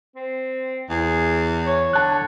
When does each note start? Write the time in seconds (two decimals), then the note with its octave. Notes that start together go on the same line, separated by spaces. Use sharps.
0.16 C4
0.90 E2 G#4
1.67 C#5
1.93 D3 A5 F#6